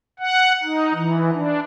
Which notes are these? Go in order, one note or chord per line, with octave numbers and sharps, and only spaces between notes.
F#5
D#4
E3
D4